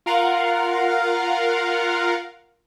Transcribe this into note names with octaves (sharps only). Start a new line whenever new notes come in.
F4 A#4 F5 F#5